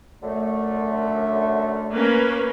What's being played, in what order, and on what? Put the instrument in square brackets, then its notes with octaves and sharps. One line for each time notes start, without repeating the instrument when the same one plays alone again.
[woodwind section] F#2 D3 A3
[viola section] A#3 C#4 B4